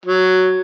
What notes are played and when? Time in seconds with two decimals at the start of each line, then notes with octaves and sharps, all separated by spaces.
0.05 F#3